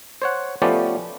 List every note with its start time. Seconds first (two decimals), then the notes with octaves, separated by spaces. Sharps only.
0.22 C5 C#5 F#5
0.62 F3 A3 B3 C#4 G4 D5